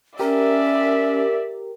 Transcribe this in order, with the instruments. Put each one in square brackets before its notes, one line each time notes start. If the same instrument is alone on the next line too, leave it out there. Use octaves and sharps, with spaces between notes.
[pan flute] C#4 [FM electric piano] G4 A#4 [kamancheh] D5 E5